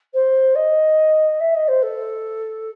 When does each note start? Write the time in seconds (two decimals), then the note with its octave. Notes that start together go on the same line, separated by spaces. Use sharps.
0.14 C5
0.55 D#5
1.40 E5
1.54 D#5
1.68 C5
1.82 A4